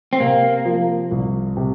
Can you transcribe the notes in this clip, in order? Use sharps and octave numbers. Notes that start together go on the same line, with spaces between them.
C4
C3 A#3
F3
C2
C3